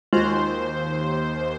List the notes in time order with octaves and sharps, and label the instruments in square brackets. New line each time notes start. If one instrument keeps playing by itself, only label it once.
[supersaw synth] D#2 C5 [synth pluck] G#3 F4 F#4